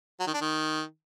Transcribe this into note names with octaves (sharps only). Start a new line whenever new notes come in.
F#3
D#3
D4
D#3